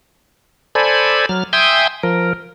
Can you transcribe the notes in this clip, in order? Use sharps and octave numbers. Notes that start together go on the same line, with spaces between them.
A4 C5 D5 G#5 B5
F#3 F6
E5 G5 G#5 C6 D#6 G6
F3 A#4